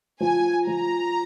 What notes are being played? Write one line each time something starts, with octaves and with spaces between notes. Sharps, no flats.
F3 G#5
F3 A#5